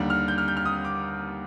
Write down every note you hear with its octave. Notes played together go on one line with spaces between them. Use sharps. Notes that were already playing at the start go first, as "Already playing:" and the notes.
Already playing: D#2 D3 G3
F6
G6
F6
G6
F6
D#6
D6